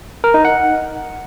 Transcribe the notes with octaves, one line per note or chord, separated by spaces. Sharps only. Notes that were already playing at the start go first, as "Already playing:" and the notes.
A#4
D#4
F#5